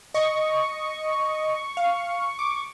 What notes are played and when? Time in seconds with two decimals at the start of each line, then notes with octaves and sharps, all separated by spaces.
0.14 D#5 C#6
1.77 F5
2.39 D6